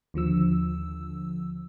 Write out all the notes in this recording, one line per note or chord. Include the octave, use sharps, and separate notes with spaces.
D#2 D3 F3 E6